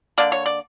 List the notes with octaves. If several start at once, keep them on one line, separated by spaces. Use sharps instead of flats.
D3 A#3 D5
C#5
D5